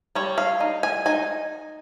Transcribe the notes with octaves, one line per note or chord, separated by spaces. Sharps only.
G3 C#5
F5
D#4
G#5
D#4 G#5